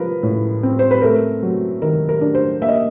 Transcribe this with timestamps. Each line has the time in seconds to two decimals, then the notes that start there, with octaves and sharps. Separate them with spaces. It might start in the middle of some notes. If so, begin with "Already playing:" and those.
Already playing: F3 A#4 B4
0.23 A2
0.63 C4
0.79 C5
0.91 B4
1.02 A3 A#4
1.43 F#3
1.82 D#3 A#4
2.09 A#4
2.21 D4
2.35 C5
2.61 A#3 E5
2.69 D#5